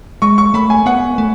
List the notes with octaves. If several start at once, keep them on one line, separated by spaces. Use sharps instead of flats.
G#3 C#6
C#6
A3 B5
G#5
B3 F#5
A3